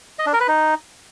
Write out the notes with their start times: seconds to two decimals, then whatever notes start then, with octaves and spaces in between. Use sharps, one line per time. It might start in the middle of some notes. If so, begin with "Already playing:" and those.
0.19 D#5
0.26 D4
0.33 A#4
0.40 B4
0.48 D#4